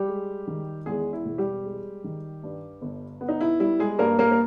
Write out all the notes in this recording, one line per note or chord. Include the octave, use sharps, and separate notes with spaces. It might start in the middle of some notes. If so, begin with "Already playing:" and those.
Already playing: G3 G4
G#3
D#3
E2 G#3 G#4
E4
E1
G3 G4
G#3
D#3
G2
G1
B3
D#4
E4
G3 E4
G#3 G#4
G2 A#3 A#4
A#3 A#4
A#4